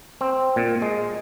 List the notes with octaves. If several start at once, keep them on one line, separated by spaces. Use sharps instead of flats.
C4
A#2
G#3